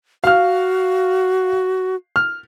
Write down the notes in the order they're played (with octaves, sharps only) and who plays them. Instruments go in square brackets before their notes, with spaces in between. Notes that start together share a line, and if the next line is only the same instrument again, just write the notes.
[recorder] F#4 [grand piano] F5 F6
[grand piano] F6